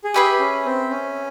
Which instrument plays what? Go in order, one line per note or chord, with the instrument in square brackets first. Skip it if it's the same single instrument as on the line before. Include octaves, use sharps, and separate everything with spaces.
[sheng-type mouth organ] G#4
[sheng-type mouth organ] G4 [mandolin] G#4 B4 E5 G#5
[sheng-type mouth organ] C#4
C4
C#4